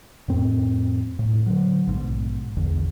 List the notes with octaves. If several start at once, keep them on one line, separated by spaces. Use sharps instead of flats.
F2 A2 C4
A2
D3 F#3
A#1 G#2 B2
A#1 E2 D3